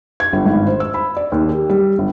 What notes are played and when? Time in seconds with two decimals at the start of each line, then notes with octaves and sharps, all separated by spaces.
0.20 G#6
0.33 G1
0.45 G#1
0.67 C5
0.80 E6
0.94 B5
1.17 D5
1.32 D#2
1.49 G4
1.70 G3
1.98 G1